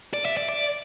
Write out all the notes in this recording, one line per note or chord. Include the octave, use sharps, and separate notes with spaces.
D5
E5
D5
D5